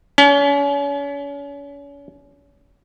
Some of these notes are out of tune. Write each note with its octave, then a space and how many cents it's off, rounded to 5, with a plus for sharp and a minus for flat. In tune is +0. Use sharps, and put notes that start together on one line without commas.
C#4 +35